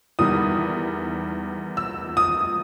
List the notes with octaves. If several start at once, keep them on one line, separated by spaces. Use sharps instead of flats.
E2 D#3 G3 D#6
E6
D#6